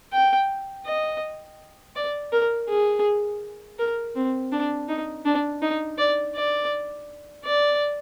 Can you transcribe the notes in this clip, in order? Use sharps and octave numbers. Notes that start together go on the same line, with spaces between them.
G5
D#5
D5
A#4
G#4
A#4
C4
D4
D#4
D4
D#4
D5
D5
D5